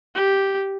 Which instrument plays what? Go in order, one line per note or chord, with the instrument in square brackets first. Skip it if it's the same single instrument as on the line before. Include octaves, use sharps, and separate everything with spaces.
[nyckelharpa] G4